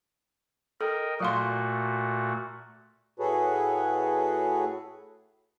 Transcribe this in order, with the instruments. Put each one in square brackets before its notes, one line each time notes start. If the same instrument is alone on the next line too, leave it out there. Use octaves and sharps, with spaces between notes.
[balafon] A4 [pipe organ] A#4 D#5 G5
[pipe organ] A#2 A3 F#4 [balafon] F#3 F5 C6
[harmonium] A2 F#4 G#4 A4 B4 C#5